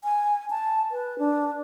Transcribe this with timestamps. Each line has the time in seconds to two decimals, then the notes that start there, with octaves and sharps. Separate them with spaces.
0.04 G#5
0.50 A5
0.91 B4
1.19 D4